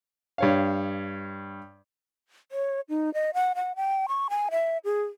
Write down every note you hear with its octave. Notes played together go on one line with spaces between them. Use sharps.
G2 C#5 F5
C#5
D#4
D#5
F#5
F#5
G5
C#6
G#5
E5
G#4